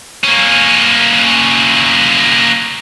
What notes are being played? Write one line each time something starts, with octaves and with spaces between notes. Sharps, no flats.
A#3 C#4